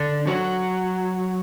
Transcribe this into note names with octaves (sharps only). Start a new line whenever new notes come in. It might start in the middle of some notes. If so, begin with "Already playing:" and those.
Already playing: D3 D4
F#3 F#4